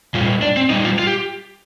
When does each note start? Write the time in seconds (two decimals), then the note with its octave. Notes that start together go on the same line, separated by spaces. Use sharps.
0.14 A#2 G3 F4
0.42 D4
0.57 C4
0.70 A#2 G3 D#4
0.84 F4
0.99 F4
1.07 G4